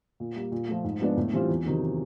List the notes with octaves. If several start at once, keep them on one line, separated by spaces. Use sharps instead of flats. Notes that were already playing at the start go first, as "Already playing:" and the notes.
A#2
G3 A#3
A#2
F3 A3
G#2
F3 G#3 B3 D4
A2
E3 G3 C4 F4
E2
C3 D#3 F#3